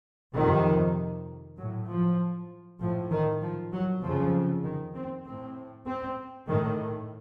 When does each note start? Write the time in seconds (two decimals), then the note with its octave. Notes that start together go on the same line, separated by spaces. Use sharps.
0.35 F2 C3 D#3
1.57 A2 F#3
1.88 F3
2.80 A2 F3
3.11 D#3
3.41 F3
3.72 F#3
4.02 F2 C#3 F3
4.64 D#3
4.95 C4
5.25 A2 C4
5.87 C4
6.48 A2 D#3